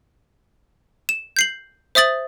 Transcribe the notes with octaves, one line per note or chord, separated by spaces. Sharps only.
E7
G6 C7 F#7
C5 E5 D#6 A6 F#7